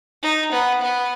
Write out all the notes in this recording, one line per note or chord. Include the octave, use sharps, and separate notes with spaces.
D#4
B3
B3